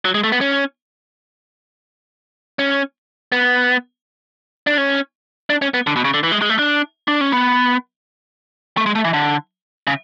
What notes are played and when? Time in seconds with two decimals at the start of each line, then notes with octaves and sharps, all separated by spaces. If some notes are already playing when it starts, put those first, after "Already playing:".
0.05 F#3
0.14 G#3
0.24 A3
0.32 B3
0.41 C#4
2.59 C#4
3.32 B3
4.67 D4
4.78 C#4
5.50 D4
5.62 C#4
5.74 B3
5.87 D3
5.96 B2
6.05 C#3
6.14 D3
6.23 E3
6.32 G#3
6.42 G#3
6.50 A3
6.59 D4
7.08 D4
7.21 C#4
7.32 B3
8.77 A3
8.86 G#3
8.95 A3
9.05 E3
9.13 D3
9.87 C#3